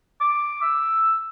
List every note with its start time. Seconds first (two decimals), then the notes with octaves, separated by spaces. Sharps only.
0.21 D6
0.62 E6